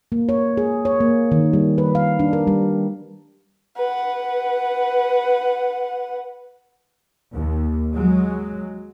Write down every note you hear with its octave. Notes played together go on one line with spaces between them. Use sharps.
A#3
C#5
G#4
C#5
A#3
D#3
G3
B4
F5
D4
A#4
G3
B4 F#5
D#2
F#3 G#3